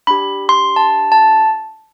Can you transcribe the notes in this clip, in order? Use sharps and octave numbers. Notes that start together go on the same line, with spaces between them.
D4 G4 B5
C6
A5
A5